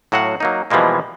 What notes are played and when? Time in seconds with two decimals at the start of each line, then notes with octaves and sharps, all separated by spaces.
0.12 A2 F#3 F#4 F5 F#5
0.40 F#3 A#3 D#4
0.71 B2 E3 F3 G3 G#3 A#3